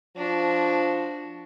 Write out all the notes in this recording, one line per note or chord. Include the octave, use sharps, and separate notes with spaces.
F3 D4 F#4